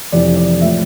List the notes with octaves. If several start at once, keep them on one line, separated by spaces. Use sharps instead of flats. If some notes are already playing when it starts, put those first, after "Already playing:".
F1 F2 C3 E3 D5
D5
A2 F3 E5